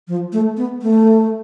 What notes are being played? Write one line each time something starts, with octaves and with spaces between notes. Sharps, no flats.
F3
A3
B3
A3